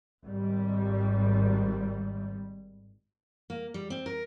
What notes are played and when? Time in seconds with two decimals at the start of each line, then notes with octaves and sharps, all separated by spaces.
0.25 G#1 G3
3.50 A#3
3.74 G3
3.90 C4
4.06 A#4